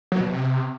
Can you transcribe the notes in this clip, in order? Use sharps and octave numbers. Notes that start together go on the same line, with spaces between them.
F#3
B2
C3